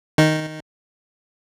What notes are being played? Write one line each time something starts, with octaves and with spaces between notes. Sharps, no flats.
D#3 D#4